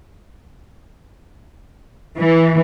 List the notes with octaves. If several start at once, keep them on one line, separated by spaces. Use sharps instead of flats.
E3